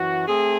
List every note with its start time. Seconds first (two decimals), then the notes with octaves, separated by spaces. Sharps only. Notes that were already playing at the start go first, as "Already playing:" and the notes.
Already playing: F#2 E3 F#4
0.28 A3 C4 G#4